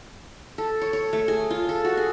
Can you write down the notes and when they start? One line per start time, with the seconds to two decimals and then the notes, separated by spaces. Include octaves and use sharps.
0.58 A4
0.82 C#5
0.93 C#5
1.13 A3
1.28 G#4
1.50 F4
1.69 A4
1.85 F#4
1.97 G#4